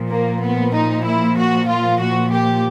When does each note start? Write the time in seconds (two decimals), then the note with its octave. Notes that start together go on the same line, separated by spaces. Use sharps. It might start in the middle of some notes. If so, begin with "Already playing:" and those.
Already playing: A#2 F3
0.12 A#3
0.43 B3
0.75 D#4
1.06 E4
1.37 F#4
1.69 F4
2.00 F#4
2.32 G4